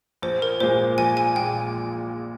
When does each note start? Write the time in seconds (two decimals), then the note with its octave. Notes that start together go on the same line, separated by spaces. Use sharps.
0.22 A#1 C5
0.42 A#4
0.60 A#2 G#3 C5
0.98 A#1 G#5
1.17 G#5
1.36 A#2 G#3 G5